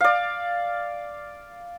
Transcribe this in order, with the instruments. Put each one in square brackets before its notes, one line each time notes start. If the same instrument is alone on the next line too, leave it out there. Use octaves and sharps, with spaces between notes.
[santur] D5 F5